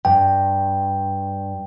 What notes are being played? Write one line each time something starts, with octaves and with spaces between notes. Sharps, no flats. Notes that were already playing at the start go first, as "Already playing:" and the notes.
G2 G5